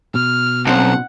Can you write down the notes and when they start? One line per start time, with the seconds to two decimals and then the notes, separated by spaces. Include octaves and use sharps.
0.15 B2 F6
0.67 B1 C4 C#4 D#4 F#5